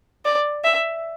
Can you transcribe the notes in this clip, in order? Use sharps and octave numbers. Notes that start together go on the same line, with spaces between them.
D5
E5